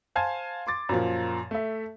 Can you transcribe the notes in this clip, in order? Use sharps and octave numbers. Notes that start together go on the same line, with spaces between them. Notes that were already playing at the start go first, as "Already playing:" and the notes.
C5 F5 G#5 A5 G#6
C6 D6 A6
F#2 A#2 F3
A3 E5